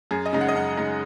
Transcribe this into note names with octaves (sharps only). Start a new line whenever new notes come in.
F#2 G#4
D#5
C#3 G#3 D#4
F#5
D#5
F#2 F#5
C#3 G#3 D#4